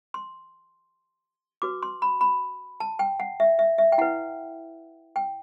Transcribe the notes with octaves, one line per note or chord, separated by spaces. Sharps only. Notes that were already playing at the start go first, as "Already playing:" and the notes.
C6
F#4 B4 D6
C6
B5
B5
A5
G5
F#5
E5
E5
E5
G5
E4 B4 F#5
G5